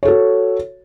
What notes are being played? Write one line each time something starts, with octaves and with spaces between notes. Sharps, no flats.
F#4 A4 C#5